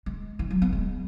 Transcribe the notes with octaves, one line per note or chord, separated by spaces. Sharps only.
G#3
E3
F#3
B3
G#3